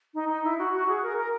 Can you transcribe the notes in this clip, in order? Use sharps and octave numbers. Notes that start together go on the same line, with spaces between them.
D#4
D#4
E4
F#4
F#4
G#4
A#4
A#4